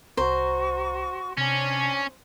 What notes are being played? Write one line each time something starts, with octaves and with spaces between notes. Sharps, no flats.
C2 F#4 C5 A#5 C#6
C3 C#4 D4 G#5 A#6